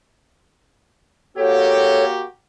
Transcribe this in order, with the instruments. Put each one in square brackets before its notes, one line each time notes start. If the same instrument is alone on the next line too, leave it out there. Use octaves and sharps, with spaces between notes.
[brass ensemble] A#3 F#4 G4 [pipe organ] A4 C#5